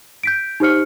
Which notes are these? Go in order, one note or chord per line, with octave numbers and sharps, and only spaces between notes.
G6 B6 D7
D#4 G4 C5 F6 C#7